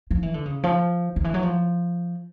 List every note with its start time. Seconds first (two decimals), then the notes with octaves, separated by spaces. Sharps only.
0.11 F3
0.23 E3
0.34 D3
0.46 C#3
0.63 F3
1.16 D#3
1.24 E3
1.34 F#3
1.43 F3